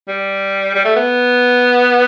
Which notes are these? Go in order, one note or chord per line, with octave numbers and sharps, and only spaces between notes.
G3
G3
A3
B3